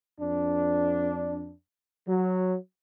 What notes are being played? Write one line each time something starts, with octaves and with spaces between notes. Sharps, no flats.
F2 D4
F#3